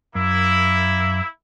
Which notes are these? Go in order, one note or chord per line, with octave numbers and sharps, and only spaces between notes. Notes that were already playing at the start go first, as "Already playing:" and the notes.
F#2 A#3 E4